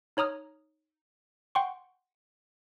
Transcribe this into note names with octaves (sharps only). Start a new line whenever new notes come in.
D#4 C#5 A#5 D#6 F6
F#5 G5 C6 C#6